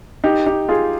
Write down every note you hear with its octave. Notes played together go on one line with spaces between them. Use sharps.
D#4 G4
D#4 G4
F4 G#4